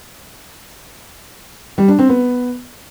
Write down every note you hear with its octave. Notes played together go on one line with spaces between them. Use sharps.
G3
D4
C4
B3